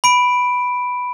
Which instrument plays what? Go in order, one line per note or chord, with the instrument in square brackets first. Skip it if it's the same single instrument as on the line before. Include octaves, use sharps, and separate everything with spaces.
[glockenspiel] B5 D7